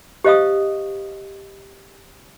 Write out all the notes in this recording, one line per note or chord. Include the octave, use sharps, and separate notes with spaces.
G4 C5 D#5 F5 C#6 D#6